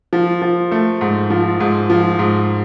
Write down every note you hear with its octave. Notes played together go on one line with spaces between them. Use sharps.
F3
F3
A3
G#2
F3
G#2
F3
G#2